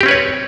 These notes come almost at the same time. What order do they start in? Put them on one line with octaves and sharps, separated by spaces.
G4 C4 C#4 B4 C#5